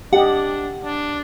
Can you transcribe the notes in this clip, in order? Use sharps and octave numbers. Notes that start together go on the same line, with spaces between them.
D4 G4 D#5 F#5
D4